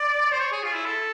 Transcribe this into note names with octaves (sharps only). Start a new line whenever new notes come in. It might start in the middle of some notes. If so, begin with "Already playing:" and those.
Already playing: D5
C5
C#5
G#4
F4
E4
A4